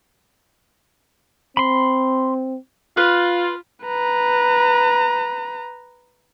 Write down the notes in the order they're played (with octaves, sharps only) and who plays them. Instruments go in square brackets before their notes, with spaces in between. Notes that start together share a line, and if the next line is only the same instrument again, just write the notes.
[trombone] C4 [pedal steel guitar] B5 C6
[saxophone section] F4 [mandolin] B4
[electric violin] B4 A#5